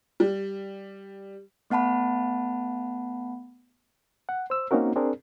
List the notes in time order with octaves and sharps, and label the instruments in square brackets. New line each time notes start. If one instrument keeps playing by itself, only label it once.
[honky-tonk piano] G3
[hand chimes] A3 B3 F#5 A5 B5
[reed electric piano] F#5
C5 E6
A#3 C4 C#4 D#4 F#4 A#4
C4 D4 G#4 A#4